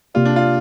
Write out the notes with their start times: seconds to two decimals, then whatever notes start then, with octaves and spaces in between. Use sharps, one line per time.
0.14 C3 A#3 F4 G4 D5
0.25 D4
0.36 F4